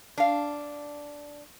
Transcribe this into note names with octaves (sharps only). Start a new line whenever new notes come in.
D4 F5